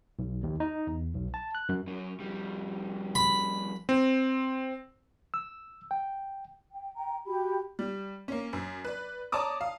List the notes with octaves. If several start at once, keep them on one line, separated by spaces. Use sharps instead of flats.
B1
D#2
D#4
E2
B1
A5
F#6
F#2
F#2 C#4
F2 G3
B5
C4
E6
G5
G5
G5 A#5
F#4 G4 G5 B5
G3
A#3 C#4
F#2
B4 D5
C#5 D5 A5 A#5 D6 D#6
F5